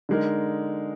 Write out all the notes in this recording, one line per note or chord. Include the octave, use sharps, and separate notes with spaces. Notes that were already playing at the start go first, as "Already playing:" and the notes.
D3 G#3 D#4 A#4